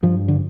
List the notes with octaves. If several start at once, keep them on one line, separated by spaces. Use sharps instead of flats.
G2 F3
D3